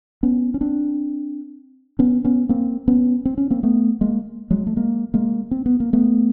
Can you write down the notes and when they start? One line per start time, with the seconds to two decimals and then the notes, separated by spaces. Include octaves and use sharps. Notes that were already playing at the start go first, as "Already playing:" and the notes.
0.23 B3 C#4
0.54 C#4
0.61 C4 D4
1.99 B3 C#4
2.25 B3 C#4
2.49 A#3 C4
2.88 B3 C#4
3.25 C4
3.38 C#4
3.50 A#3 C4
3.63 A3 B3
4.01 G#3 A#3
4.50 F#3 G#3
4.67 A3
4.76 G#3 A#3
5.14 G#3 A#3
5.51 C4
5.66 B3
5.80 A#3
5.93 A3 B3